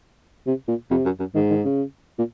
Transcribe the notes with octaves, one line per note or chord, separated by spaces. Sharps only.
C3
A#2
F2 C3
F#2
F#2
G#2 D#3
D#3
C#3
A#2